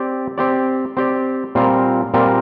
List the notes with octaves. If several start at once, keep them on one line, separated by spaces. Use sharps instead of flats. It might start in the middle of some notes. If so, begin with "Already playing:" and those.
Already playing: C4 G4 D5
C4 G4 D5
C4 G4 D5
A#2 G3 C4 F4 A#4
A#2 G3 C4 F4 A#4